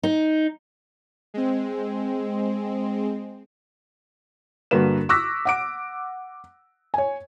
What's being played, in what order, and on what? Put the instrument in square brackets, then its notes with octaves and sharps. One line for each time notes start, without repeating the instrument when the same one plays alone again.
[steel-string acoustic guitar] D#4
[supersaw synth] G#3 C4
[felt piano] G2 D3 A#3 F#4 B4 E7
C#6 D6 E6 F#6 A#6 B6
F#5 D6 D7
C#5 G#5